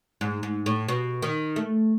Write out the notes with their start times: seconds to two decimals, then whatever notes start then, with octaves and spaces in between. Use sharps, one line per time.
0.21 G#2
0.43 G#2
0.66 A2
0.88 B2
1.22 D#3
1.56 A3